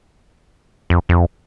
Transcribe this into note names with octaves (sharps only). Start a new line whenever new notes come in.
F2
F2